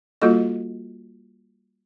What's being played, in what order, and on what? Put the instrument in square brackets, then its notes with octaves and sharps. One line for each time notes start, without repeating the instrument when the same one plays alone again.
[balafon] G3 A#3 F4 F#4 A4 D#5